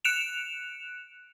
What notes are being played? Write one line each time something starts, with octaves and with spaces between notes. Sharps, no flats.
F#6 C#7 D7 E7 F7